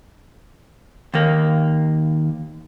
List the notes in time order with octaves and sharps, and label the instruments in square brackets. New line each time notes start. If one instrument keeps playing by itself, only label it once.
[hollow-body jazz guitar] D#2 A#3